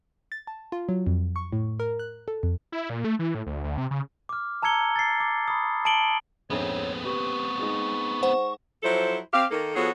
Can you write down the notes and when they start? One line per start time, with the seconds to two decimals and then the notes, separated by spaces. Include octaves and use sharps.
0.32 A6
0.47 A5
0.72 F4
0.89 F#3
1.07 F2
1.36 C#6
1.53 A2
1.80 A#4
1.99 F#6
2.28 A4
2.43 F2
2.72 E4
2.90 A#2
3.04 A3
3.19 E3
3.35 A2
3.46 D2
3.64 D2
3.78 C3
3.91 C#3
4.29 D6 F6
4.62 A5 A#5 E6 G#6 C#7 G7
4.96 A6 C7
5.20 D6
5.48 B5 D#6
5.85 A5 C#7 D7 F#7 G7
6.50 A#1 F2 G#2 B3 C4 C#5
7.05 G4 B4 C#6
7.59 G#3 D#4
8.23 C5 F#5
8.83 F3 F#3 E4 A4 C5
9.33 C4 G4 F5
9.51 D#3 A#3 A4
9.75 F3 B3 F#4 G#4 A4 C#5